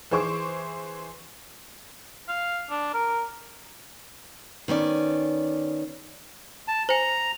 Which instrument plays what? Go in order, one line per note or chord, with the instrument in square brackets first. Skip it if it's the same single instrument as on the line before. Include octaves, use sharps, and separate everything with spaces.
[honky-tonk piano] E3 G#4 C5 C#6 D6
[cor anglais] F5
D4
A#4
[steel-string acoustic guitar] D#3 B3 C#4 D5
[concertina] A5
[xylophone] C5 G#5 [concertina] A#5